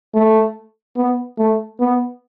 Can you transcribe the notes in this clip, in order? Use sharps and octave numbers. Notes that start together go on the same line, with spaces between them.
A3
B3
A3
B3